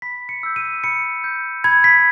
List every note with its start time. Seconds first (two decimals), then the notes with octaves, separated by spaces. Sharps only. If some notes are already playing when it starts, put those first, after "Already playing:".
0.02 B5 B6
0.29 C#7
0.43 E6 G6
0.56 D#7
0.84 B5 C#7
1.24 G6
1.64 B5 G#6
1.84 B6